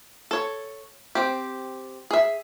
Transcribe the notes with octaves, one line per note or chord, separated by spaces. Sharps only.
A4 C#5
C4 G4
G#4 E5